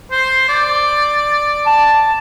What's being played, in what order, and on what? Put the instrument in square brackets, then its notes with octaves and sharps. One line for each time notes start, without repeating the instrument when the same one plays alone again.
[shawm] C5
D5
[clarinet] A5